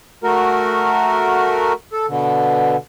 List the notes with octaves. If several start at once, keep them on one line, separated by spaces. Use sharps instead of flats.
A3 F#4 A#4
A4
B2 D3